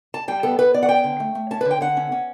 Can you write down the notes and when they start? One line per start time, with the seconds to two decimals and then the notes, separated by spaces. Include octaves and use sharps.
0.14 A5
0.28 G3 G5
0.43 B3 A4
0.59 B3 B4
0.74 B3 D5
0.83 F#5
0.89 C#4 G5
1.04 D3
1.20 A3
1.35 A3
1.51 C#4 A5
1.61 D3 B4
1.71 G5
1.81 D3 F#5
1.97 C#4
2.12 C#4